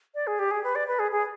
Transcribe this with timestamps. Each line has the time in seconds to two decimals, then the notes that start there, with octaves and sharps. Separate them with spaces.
0.15 D5
0.27 G#4
0.39 G4
0.51 G#4
0.64 B4
0.75 D5
0.88 B4
0.99 G#4
1.12 G#4